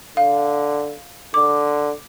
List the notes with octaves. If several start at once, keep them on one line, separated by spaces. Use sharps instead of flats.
D3 F5
D3 D6